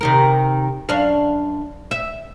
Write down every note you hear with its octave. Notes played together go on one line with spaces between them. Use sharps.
C3 D#3 A#4
F#2 D4 F5
E5